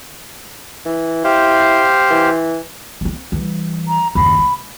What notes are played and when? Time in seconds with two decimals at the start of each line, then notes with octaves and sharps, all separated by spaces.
0.85 E3
1.24 E4 G4 C5 F5
2.11 E3
3.01 B3 C4
3.32 E3 G3
3.88 A#5
4.15 F#1 D#2 B5
4.38 A3